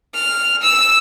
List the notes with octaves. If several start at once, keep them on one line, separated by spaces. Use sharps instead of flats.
F6
E6